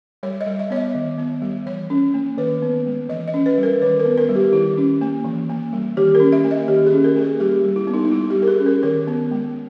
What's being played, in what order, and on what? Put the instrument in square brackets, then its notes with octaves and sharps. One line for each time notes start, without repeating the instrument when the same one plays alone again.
[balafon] G3 C#5
D#5
G3
E5
B3 C#5
D#5
D#3
B3
G3
E3 C#5
C#4
A#3
D#3 B4
B3
G#3
E3 D#5
D#5
C#4
B4
G3
A#4
D#3 B4
A#4
B3
A#4
G3
G4
D#3 E4
C#4
A#3
E3
A#3
G3
D#3 G4
A#4
C#4
E5
A#3
D#5
D#3 G4
G#4
C#4
A#4
A#3
G#4
G3 G4
G3
E4
B3
D#4
D#4
G3 E4
G4
G3
A#4
G#4
C#4
A#4
D#3 A#4
B3
G#3